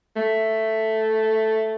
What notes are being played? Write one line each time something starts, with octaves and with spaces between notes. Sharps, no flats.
A3